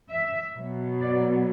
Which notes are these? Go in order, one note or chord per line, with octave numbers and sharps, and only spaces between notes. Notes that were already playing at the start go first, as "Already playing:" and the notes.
E5
B2 F#3 B3
D5